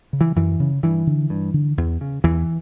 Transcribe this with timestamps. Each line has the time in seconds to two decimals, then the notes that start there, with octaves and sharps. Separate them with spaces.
0.13 C#3
0.21 E3
0.36 F#2 E3
0.60 C#3
0.83 G2 E3
1.07 D3
1.30 G2
1.54 D3
1.77 E2
2.01 C#3
2.24 E2 E3